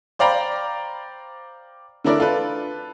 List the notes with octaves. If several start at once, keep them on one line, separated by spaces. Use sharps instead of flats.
C5 D5 F5 G5 A#5 B5
D3 A3 D4 E4 A#4 D5
F4 A4 B4